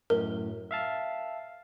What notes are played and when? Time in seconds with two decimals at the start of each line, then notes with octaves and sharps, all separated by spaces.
0.10 F#2 A2 A#4
0.71 E5 F5 A5